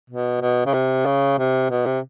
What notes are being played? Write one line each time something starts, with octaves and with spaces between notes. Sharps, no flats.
B2
B2
C#3
C3
C#3
C3
B2
C3